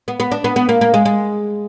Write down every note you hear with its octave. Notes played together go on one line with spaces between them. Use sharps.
B3
B3
D4
B3
B3
A#3
A#3
G#3
G#3